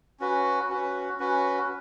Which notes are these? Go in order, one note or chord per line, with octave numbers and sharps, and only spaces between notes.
C#4 F#4 B4
C#4 F#4 B4
C#4 F#4 B4